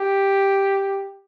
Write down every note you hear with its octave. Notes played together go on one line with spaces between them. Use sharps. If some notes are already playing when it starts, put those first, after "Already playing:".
Already playing: G4